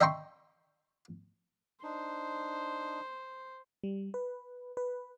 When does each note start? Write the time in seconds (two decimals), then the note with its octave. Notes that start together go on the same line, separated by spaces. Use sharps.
0.01 D#5 E5 G5 A#5 C6 C#6
1.83 D4 D#4 C5
3.84 G3
4.14 B4
4.77 B4